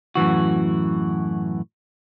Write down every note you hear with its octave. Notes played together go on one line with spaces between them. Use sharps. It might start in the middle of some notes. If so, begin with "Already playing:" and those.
F#2 A2 E3 F#4